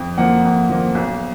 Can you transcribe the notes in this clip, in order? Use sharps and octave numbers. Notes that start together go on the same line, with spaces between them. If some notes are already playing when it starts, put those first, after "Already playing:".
Already playing: F2
F3 A#3 F#5
F2
F3 A#3
B1